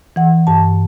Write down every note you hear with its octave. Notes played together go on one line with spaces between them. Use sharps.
E3 F#5
G2 A5